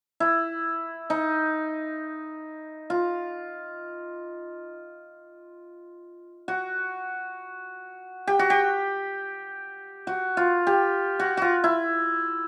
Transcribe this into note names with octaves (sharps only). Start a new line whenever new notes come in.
E4
D#4
F4
F#4
G4
F#4
G4
F#4
F4
G4
F#4
F4 F#4
E4